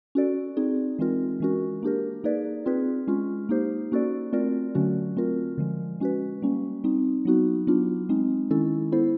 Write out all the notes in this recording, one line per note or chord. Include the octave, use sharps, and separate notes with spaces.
C#4 F#4 A4 D5
C4 D#4 G#4
E3 G#3 C4 F4 A#4
E3 G#3 C#4 F#4 A#4
A#3 D4 G4 A#4
A#3 D#4 G#4 B4 D5
C4 F4 G#4 B4
G#3 C#4 F4
A#3 D#4 G4 C5
A#3 C#4 F#4 A4 D5
A3 C4 F4 A#4 D5
D3 F#3 A3 C#4 F#4
A3 C4 F4 A#4
D3 F3 G#3
G#3 C#4 F#4 B4
G3 A#3 C#4
G3 C4 D#4
F#3 B3 D#4 F#4
F#3 B3 D4 F4
G#3 C4 D#4
D#3 G#3 C#4 E4 A4
B3 E4 A4 C5